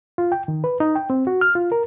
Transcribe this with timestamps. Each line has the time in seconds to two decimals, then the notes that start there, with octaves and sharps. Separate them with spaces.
0.18 F4
0.32 G5
0.48 D#3
0.64 B4
0.80 D#4
0.95 G5
1.10 C4
1.27 F#4
1.41 F6
1.55 F4
1.72 A#4